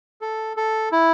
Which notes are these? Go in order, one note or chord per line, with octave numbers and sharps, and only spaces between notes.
A4
A4
E4